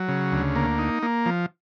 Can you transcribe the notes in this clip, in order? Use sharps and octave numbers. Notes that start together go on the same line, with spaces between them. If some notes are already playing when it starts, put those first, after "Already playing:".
Already playing: F#3
C#3
D2
A#3
D#4
A#3
F3